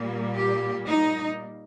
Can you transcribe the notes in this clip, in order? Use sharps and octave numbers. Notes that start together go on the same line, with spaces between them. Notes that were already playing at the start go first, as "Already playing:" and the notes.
Already playing: A#2 G3 A#3
G4
D#4